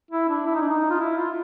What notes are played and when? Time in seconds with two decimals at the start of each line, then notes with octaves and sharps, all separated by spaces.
0.11 E4
0.29 D4
0.46 E4
0.55 D#4
0.61 D4
0.69 D#4
0.90 F4
1.00 E4
1.17 F4